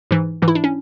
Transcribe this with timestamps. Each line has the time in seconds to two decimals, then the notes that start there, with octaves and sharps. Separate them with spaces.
0.11 G#2 E3
0.42 G#2 E3
0.48 E4
0.55 D4
0.64 C#4